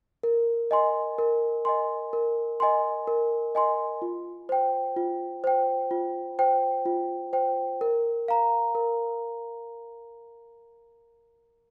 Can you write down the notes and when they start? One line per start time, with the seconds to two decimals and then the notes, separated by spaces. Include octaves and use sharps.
0.23 A#4
0.71 D#5 G#5 C6
1.18 A#4
1.65 D#5 G#5 C6
2.13 A#4
2.60 D#5 G#5 C6
3.07 A#4
3.55 D#5 G#5 C6
4.02 F4
4.49 C5 G5
4.97 F4
5.44 C5 G5
5.91 F4
6.39 C5 G5
6.86 F4
7.33 C5 G5
7.81 A#4
8.28 F5 A#5
8.75 A#4